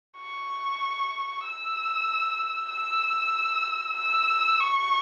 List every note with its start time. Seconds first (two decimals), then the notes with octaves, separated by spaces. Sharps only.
0.19 C#6
1.45 E6
2.71 E6
3.97 E6
4.60 C#6